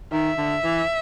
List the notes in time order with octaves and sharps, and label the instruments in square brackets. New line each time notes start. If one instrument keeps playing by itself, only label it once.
[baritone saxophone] D#3 [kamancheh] E5
[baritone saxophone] D3
E3